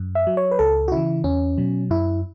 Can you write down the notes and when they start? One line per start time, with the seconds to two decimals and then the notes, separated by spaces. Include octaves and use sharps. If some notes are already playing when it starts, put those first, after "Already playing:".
Already playing: F#2
0.15 E5
0.27 F#3
0.37 C#5
0.51 B4
0.59 C#2 A4
0.88 F#4
0.92 C#3 E3 E4
1.24 E2 C#4
1.58 B2 F#3
1.90 F#2 E4